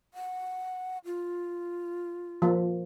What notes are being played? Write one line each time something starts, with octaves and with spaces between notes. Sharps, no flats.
F#5
F4
F3 A#3